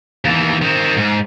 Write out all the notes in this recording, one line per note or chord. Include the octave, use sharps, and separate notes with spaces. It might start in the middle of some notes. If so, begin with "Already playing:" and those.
D#2 E3
D#3 C4
G#2